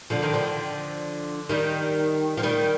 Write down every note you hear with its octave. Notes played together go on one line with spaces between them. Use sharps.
D3 F3
D#3
D3 F3
D#3 G3
F3
D#3 G3